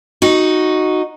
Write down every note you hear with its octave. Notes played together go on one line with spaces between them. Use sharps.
D#4 F#4